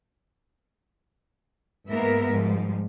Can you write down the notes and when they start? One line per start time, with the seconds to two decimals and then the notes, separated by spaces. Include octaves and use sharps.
1.87 G#2 G#3 A#3 B3 A#4 E5
2.28 G#2 F3 G3